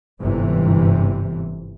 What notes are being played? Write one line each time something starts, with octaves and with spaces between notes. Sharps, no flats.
G1 G#2 C3 E3